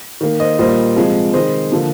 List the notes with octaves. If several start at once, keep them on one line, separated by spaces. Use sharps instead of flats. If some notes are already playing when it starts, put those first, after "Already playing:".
D#3 A#3
C5 D#5
A#2 G3 A#3 C5 D#5
C3 F3 G#3
C3 D#3 G#3 C5 D#5
D3 F3 A#3